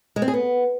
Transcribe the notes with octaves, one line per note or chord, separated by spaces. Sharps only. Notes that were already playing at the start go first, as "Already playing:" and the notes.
G#3
C4
G#4
B3